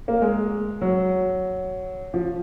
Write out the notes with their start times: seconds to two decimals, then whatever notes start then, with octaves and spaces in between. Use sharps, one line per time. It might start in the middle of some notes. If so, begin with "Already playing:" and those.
0.08 A#3
0.22 G#3
0.81 F#3
2.14 F3